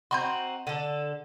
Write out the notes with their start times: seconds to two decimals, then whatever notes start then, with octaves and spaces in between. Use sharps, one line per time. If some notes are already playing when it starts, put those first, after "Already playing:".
0.11 C4 D#4 F#4 B5 C6 G6
0.67 D3 A4